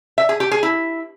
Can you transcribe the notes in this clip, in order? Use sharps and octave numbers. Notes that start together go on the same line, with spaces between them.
E5
G#4
G4
G#4
E4